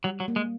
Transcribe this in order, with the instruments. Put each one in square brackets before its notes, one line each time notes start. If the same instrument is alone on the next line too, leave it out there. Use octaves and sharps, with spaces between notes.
[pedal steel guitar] F#3 [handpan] G3
[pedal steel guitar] F#3
[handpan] A#3
[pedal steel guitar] G#3